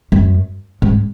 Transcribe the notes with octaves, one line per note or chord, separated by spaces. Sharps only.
F#2
G#2